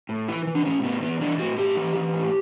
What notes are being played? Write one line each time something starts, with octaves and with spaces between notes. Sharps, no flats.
A2
E3 E4
E3
D4
A2 C#4
A2 B3
E3 B3
E3 D4
A2 F#4
A2 G4
E3
E3
A2